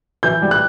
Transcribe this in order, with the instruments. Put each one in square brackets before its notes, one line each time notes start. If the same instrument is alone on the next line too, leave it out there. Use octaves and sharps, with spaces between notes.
[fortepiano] E3 [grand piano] G6
[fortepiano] G3
[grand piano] F#6